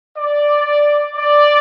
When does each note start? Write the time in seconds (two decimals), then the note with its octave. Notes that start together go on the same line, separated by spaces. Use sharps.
0.18 D5
1.16 D5